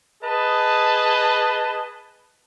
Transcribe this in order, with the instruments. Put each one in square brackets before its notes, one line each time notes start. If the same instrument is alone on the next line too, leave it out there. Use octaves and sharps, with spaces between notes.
[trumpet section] G#4 B4 D#5 A5